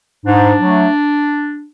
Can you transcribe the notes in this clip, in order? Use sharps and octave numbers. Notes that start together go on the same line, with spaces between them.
G#2 D4
F#3 A3